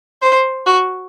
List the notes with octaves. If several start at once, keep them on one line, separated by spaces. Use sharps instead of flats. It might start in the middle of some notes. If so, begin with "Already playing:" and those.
C5
F#4